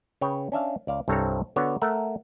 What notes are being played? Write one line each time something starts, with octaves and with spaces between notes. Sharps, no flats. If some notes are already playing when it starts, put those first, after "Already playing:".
C#3 B4 C#5 G5
C#4 D4 E5 F5
C#2 D5 F5
C2 G2 C4 A4 C#5 A#5
D3 B3 F#4 C#5 D5
A3 A#4 E5 F#5